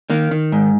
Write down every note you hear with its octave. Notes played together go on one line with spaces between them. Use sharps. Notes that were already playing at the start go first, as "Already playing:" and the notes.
D#3 A#3
D#3
G#2